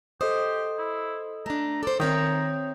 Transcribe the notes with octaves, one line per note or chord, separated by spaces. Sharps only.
G4 A4 C5 D#5 D#6
E4
A3 D4 A#5
A4 C5 D5
D#3 C4 C#5 E5 A#5 D#6 G6